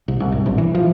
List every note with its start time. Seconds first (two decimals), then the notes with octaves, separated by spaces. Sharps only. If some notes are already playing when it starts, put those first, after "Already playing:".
0.08 C2
0.20 C2
0.32 G#1
0.46 A#1
0.58 E3
0.75 F3